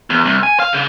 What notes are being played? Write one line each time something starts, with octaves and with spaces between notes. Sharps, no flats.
E2
C2
G#5
F5
C#3